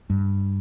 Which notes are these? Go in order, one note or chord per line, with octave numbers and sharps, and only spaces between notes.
G2